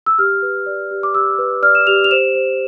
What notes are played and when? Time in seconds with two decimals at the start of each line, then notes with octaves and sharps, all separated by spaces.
0.06 E6
0.18 G4 F6
0.42 B4
0.66 D5
0.91 G4
1.03 D6
1.14 G4 E6
1.39 B4
1.62 D5 F6
1.75 E7
1.87 G4 F7
2.04 F7
2.11 C5 E7
2.35 C5